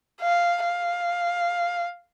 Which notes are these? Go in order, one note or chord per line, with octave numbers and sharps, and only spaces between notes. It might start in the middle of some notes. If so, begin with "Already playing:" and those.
F5
F5